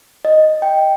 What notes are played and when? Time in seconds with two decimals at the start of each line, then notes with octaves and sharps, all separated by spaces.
0.25 D#5
0.62 G5